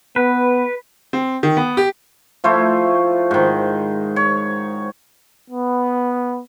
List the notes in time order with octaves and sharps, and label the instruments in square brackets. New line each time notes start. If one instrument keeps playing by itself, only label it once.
[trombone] B3 [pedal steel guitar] B4
[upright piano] C4
D#3
B3
G4
[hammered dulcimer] F3 A3 E4 C5
G#2 D#3
C#5
[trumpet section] B3